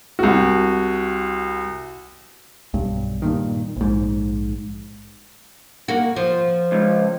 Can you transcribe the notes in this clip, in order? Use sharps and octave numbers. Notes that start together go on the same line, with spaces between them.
C2 F#4
B1 G2
G2 A#2 D#3
A#1 G#2
A#3 F#4
F3
C#2